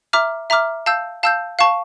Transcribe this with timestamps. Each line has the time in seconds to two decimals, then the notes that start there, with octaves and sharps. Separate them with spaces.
0.13 E5 A#5 D6 F6
0.50 E5 A#5 D6 F6
0.86 F5 A5 E6 G6
1.23 F5 A5 E6 G6
1.59 F5 A5 C#6